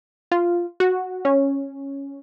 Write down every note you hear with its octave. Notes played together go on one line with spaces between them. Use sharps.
F4
F#4
C#4